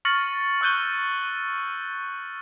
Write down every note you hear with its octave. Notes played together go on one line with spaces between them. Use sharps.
C#6 F6 A6 A#6 C#7 F#7
C#6 E6 F#6 G6 D#7 G7